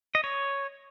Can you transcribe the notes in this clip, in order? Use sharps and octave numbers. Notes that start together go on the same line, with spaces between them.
D#5
C#5